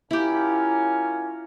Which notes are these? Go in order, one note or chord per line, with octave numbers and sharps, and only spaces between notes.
A#3 C#4 E4 F4 G4